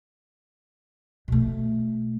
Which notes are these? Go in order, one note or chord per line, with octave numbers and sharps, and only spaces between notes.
B2 A3